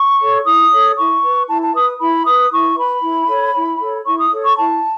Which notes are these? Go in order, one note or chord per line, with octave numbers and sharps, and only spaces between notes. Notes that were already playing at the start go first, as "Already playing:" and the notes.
Already playing: C#6
A4 C#5
E4 D#6
A4 C#5
E4 C#6
B4
E4 A5
A5
B4 D#6
E4 B5
B4 D#6
E4 C#6
B4 B5
E4
A4 C#5
E4
A4 C#5
E4 C#6
D#6
A4 C#5
C#6
E4 A5